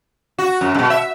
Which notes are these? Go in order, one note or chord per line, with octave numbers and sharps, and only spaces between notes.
F#4
F#2
G2 B2
E5